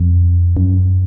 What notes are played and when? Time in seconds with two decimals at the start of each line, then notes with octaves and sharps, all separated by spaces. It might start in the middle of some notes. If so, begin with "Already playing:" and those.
Already playing: F2
0.57 F#2